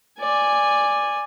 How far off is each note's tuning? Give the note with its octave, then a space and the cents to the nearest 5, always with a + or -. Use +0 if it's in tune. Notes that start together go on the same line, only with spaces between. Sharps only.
D5 +0 G#5 -10